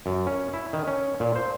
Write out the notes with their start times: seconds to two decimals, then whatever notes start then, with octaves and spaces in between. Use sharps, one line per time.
0.06 F#2
0.27 C#4
0.53 E4
0.73 D#3
0.87 C#4
1.20 A#2
1.36 C5